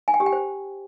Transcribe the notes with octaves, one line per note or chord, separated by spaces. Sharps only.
G#5
G5
G4
G5
C5